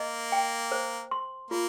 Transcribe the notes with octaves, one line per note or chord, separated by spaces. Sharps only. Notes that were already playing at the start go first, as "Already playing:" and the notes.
Already playing: A#3 D#5
G5
C5
C6
A#3 F4